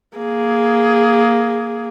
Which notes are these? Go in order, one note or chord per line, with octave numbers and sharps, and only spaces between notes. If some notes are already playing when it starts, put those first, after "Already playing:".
A#3 G#4